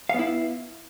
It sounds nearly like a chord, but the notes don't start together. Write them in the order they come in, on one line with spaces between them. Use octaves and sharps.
F5 B3 E4